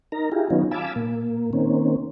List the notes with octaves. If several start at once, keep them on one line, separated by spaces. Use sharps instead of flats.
D#4 A#4 A#5
E4 F4 G4 G#4
D#3 F#3 B3 C#4 D#4 F4
F5 G#5 A5 B5 D6 E6
A#2 A#3
D#3 A#3 C4 C#4